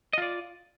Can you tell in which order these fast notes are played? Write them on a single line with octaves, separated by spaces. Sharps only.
D#5 F4 D5